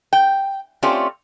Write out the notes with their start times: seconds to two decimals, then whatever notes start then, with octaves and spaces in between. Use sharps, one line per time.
0.13 G5
0.83 A3 C4 C#4 F4 G4 D5